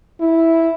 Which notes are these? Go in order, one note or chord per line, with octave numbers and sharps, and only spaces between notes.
E4